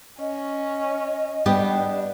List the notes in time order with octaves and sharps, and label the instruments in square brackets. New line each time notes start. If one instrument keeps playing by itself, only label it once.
[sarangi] C#4 [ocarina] D#5
[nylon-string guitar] G3 B3 G4 [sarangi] D4